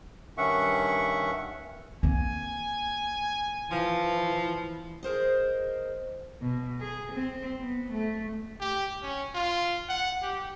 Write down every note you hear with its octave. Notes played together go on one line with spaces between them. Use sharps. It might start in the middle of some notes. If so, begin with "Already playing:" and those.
G2 D#3 C#4 E5 F#5 C#6
A#3 C4 G#5
E3 F3
G#4 A#4 C5 D#5
B2
G#4
C4
B3
A3
G4
C#4
F4
F#5
G4